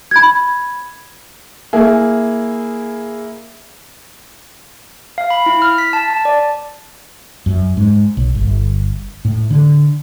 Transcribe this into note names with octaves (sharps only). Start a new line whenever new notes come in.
B5 G#6
A#3 E4 G#4
F5
B5
E4
F6
B6
A5
A5
D5
F#2
G#2
B1
G1
A2
D3